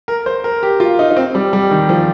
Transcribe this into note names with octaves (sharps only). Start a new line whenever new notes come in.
A#4
C5
A#4
G4
F4
D#4
D#4
C4
G3
G3
D#3
F3